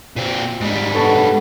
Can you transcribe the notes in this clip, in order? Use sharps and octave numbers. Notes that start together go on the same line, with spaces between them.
A#2 C4
G#2 G3
B3 A4 C#5 A5